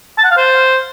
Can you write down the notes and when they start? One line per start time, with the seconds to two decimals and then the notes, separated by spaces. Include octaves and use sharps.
0.18 A5
0.24 F#5
0.31 F5
0.37 C5